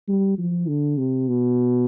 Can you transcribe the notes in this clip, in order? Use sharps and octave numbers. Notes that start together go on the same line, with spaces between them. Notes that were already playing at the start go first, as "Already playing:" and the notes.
G3
F3
D3
C3
B2